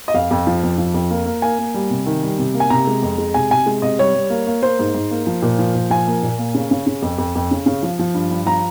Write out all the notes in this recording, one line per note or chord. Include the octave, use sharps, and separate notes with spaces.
D#5
F2 F5
F2
F3
F2
F3
F2
A#3
A#3
A#3 G#5
A#3
G3
C3
D#3
G3
C3
A#3
G#5
C3 A#5
G#3
F2
G#3
C3 G#5
C3 G#5
G#3
C3 D#5
G3 C#5
G3
A#3
A#3
A#3 C5
G#2
G#2
A#3
F3
A#2
F3
A#2
F3 G#5
A#3
A#2
A#3
C#3
C#3
C#3
F2
F2
F2
C#3
C#3
F3
F3
G2
G2
F3 A#5